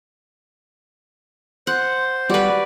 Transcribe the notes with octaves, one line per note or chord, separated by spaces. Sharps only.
C5 F#5
G3 F#4 B4 D5